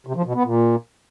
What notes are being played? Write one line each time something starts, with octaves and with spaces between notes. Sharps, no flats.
C3
F3
B2
B3
A#2